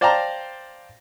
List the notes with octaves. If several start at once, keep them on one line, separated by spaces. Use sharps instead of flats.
C5 D5 F5 G5 A5 A#5